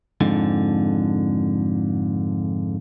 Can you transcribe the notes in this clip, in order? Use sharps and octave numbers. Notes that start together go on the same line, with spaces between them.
F2 G#2 D3